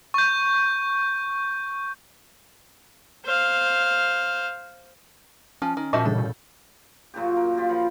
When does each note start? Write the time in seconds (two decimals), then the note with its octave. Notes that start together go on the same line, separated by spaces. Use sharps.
0.14 C#6 G6
3.26 C5 F5
5.62 F3 C#4
5.77 D#3
5.93 A#2 F3 F#4 D#5 E5 A5 G6
6.05 A1 G2 C#3 D4 A4
6.18 B2
7.14 F#2 A#2 C#3 G4
7.37 A#4
7.57 F4 G4
7.69 F3 B5